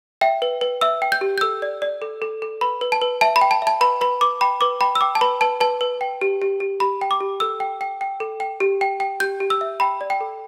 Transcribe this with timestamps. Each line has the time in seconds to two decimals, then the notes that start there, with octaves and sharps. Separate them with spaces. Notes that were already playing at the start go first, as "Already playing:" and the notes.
0.21 E5 G5
0.42 B4
0.61 B4
0.81 E5 E6
1.02 G5
1.12 G6
1.21 G4
1.38 G6
1.41 A4 E6
1.62 D5
1.82 D5
2.02 A4
2.22 A4
2.42 A4
2.61 B4 B5
2.81 B4
2.92 A5
3.01 B4
3.21 E5 A5
3.36 B5
3.41 G5
3.51 A5
3.62 E5 A5
3.81 B4 B5
4.01 B4 B5
4.21 B4 D6
4.41 G5 B5
4.61 B4 D6
4.81 G5 B5
4.95 E6
5.01 G5 D6
5.15 A5
5.21 B4 B5
5.41 B4 A5
5.60 B4 A5
5.81 B4
6.01 G5
6.21 G4
6.42 G4
6.60 G4
6.80 G4 B5
7.01 G5
7.11 D6
7.21 G4
7.40 A4 E6
7.60 G5
7.81 G5
8.01 G5
8.20 A4
8.40 G5
8.60 G4
8.81 G5
9.00 G5
9.20 G4 G6
9.40 G4
9.50 E6
9.61 E5
9.80 G5 B5
10.01 D5
10.10 G5
10.21 A4